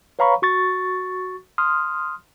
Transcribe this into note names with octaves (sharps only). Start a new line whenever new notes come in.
B4 C#5 F5 A#5 B5 C#6
F#4 C#6 A6
C6 D#6 F6